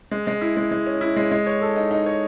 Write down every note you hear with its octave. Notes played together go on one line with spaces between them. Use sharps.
G#3
G#3
E4
G#3
G#3
C#4
E4
G#3
G#3
C#5
A4
D#4
D#4
C#5